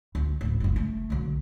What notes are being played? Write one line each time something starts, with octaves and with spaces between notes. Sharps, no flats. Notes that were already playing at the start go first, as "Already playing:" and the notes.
D2
D1 E3
F#1 C#2
A3
B1 D3